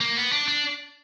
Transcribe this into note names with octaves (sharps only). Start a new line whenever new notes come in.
A#3
B3
D4
D4